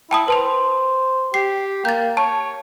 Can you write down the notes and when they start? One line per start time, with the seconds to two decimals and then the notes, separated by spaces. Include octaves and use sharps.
0.11 E4 G5 A5 D#6
0.28 B4 C5 A5 C6
1.34 G4 C7
1.85 A#3 G6 A6
2.17 C#5 A5